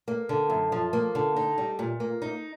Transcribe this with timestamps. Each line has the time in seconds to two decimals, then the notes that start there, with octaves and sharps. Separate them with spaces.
0.08 A#3
0.29 D3
0.50 F#2
0.72 F3
0.93 A#3
1.15 D3
1.36 D#4
1.58 G3
1.79 A#2
2.00 A#3
2.22 D#4